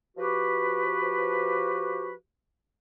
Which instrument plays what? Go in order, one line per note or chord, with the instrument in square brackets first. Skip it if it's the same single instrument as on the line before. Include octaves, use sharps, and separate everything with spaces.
[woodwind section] F3 F#4 G4 B4